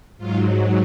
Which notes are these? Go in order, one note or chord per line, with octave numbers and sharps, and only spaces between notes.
G#2 F#3 F4